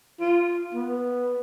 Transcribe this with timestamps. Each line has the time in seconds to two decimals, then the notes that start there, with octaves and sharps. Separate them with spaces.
0.20 F4
0.75 B3